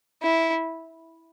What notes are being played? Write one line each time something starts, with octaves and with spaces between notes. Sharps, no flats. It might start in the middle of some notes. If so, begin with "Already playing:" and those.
E4